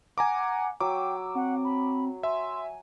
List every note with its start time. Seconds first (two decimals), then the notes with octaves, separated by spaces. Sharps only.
0.18 F#5 G#5 A#5 D6
0.80 F#3 G5 D6 E6
1.35 C4 F#5
1.64 B5
2.23 E5 G#5 C6